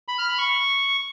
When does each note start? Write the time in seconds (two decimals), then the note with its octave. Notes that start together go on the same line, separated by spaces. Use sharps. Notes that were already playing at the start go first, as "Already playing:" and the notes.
0.08 B5
0.18 F6
0.28 B5
0.38 C#6